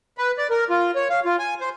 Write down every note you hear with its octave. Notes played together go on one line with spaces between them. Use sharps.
B4
D5
A#4
F4
C#5
F5
F4
G#5
C5